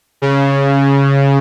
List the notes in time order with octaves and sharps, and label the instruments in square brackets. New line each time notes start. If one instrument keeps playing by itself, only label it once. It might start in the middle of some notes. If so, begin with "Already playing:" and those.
[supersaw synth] C#3